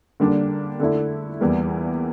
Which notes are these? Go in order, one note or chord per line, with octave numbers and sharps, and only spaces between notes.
D3 G3 A#3 D4
D3 A3 E4
E2 E3 G3 A#3